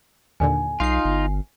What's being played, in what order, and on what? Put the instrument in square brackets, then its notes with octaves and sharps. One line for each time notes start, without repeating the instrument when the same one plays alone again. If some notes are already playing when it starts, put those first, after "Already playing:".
[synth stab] D#2 A#2 D3 [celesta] G#5
[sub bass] B1 [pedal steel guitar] D#4 F4 [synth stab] F5 C7
[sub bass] G1